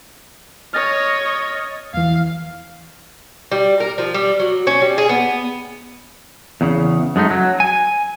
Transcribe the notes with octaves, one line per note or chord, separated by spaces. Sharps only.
C#5 D#5 F6 A6 A#6
E2 E3 F5
G3
A#4
F3
G3
F#3
C#4
G3
G#4
B3
E2 C#3
F#2 G#3 A3 D#4
F#3
G#5